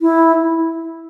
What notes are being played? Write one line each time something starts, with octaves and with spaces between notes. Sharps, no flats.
E4